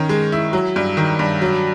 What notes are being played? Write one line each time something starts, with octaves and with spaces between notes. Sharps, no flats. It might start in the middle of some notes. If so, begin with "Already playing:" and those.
Already playing: D#3 C#4
G#3
E4
F#3
G2
D#3
G2
F#3